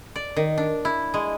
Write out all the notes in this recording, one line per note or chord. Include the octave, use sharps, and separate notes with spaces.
D5
D#3
D4
E4
G#3